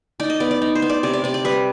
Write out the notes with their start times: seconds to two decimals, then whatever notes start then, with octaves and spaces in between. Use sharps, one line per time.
0.20 D#4 D5
0.30 D#5
0.40 B3 D5
0.51 D5
0.62 D#4
0.75 C5
0.82 B3
0.89 D5
1.03 C3 D5
1.13 D5
1.24 C3 D5
1.34 D5
1.45 G3 B4